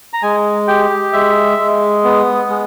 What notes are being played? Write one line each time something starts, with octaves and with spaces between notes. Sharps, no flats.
A#5
G#3 G#5
G4 G5
G#3 E5
G#3
B3
G#3